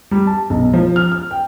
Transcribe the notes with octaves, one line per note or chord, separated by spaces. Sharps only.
G3
A5
B1
F3
F6
F6
G5